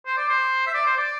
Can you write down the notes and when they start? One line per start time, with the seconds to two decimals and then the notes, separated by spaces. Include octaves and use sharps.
0.06 C5
0.17 D5
0.29 C5
0.67 E5
0.74 D5
0.86 C5
0.97 D5